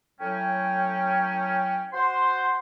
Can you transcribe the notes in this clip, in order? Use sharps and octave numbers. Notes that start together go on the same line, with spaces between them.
A2 F#3 C#4 G5
F#4 C5 C6